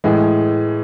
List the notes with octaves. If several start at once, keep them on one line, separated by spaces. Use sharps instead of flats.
A2 E3 G#3